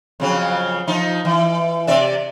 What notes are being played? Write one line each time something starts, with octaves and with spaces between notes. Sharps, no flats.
F2 C#3 F#3
F3 D#4
E3
C3 D5 E5